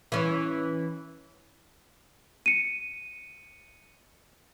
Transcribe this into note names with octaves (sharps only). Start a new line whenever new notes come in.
E3 C#4
C#7 D#7